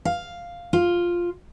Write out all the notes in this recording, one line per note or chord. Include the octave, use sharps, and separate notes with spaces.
F5
F4